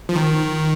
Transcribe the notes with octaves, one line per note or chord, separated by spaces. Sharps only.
F3
D#3